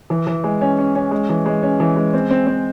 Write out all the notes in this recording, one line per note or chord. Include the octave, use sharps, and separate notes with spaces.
E3
E3
G#3
C#4
C#4
C#4
G#3
E3
G#3
C#4
E3
G#3
C4
C4
C4